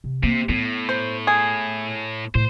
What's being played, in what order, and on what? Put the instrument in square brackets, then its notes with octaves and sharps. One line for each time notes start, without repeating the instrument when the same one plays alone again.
[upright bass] C3
[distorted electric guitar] C3 [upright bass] A#3
[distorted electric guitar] A2 [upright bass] B3
[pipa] C5
G#4
[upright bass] A2 [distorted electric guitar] C5